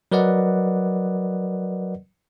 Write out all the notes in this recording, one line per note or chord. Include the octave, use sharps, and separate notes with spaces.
F#3 A#4 B4 D5 D#5 F#5